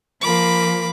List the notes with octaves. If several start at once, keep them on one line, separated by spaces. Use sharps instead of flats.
F3 A#3 B5 D6